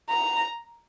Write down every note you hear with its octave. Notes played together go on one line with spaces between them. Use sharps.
A#5